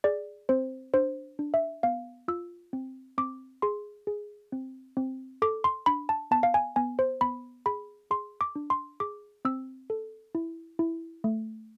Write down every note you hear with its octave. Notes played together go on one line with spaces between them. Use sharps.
G#4 D5
C4 C5
D4 C5
D4
E5
B3 F5
F4 E6
C4
C4 D6
G#4 C6
G#4
C4
C4
A4 D6
C6
D4 B5
A5
B3 A5
F5
G#5
B3 G#5
C5
B3 B5
G#4 B5
G#4 C6
D6
D4
C6
G#4 D6
C4 E6
A4
E4
E4
A3